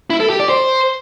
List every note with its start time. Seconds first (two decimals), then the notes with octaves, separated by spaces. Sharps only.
0.10 E4
0.20 A4
0.30 G4
0.40 D5
0.49 C5